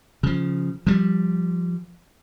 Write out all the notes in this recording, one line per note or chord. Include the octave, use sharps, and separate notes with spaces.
C#3 F3
F3 G3